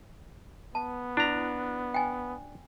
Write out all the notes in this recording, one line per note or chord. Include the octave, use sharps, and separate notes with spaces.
B3 A5
D4 E4 A#5
G5 G#5